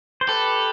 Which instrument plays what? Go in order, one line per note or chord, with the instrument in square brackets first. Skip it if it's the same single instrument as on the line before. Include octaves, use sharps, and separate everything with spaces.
[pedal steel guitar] C5
[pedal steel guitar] G4 B4 [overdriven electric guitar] A4